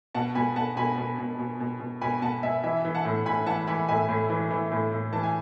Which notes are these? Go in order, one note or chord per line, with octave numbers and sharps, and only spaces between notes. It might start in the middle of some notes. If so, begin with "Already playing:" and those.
B2 F#5 A5
B2 G#5 B5
B2 F#5 A5
B2 G#5 B5
B2
B2
B2
B2
B2
B2 G#5 B5
B2 F#5 A5
B2 E5 G#5
E3 E5 G#5
E3
F#5 A5
A2
A2 G#5 B5
E3 F#5 A5
E3 G#5 B5
A2 E5 G#5
A2
E3
E3
A2
A2
E3 A5
G#5